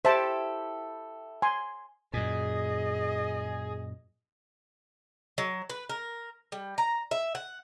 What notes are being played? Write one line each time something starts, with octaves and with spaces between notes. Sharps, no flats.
E4 G4 A4 C5 E5 A5
G#5 C6
F#2 A#2 G#4 D#5
F#3
B4
A#4
G3
A#5
E5
F#5